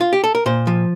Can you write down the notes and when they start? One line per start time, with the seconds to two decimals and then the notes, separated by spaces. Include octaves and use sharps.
0.01 F4
0.13 G4
0.24 A4
0.35 A#4
0.46 A#2 C5
0.67 F3